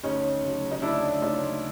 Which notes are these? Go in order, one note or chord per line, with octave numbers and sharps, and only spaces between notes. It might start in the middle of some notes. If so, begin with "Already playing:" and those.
D2 C#4 D#4
C#3 F#3
D#4
D2 D4 E4
C#3 F#3 D#4 F4